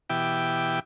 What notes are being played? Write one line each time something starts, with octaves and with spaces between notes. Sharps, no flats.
B2 E3 E4 G4 G5 D6